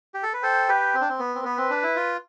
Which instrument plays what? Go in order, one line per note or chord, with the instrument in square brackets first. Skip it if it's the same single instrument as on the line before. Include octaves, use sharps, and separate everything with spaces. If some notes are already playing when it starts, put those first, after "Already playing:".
[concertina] G4
A4
B4
[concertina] A4 C5 [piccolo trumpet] G5
[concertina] G4 B4
C4
D4
C4
B3
C4
[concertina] B3 [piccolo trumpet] B4
[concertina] C4
D4
E4
F4